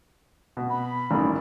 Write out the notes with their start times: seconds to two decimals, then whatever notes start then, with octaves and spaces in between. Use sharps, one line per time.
0.57 B2
0.70 B5
1.11 A1 G2 D#3